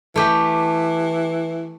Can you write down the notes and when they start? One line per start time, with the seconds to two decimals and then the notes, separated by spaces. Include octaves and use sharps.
0.16 E3 A3 G4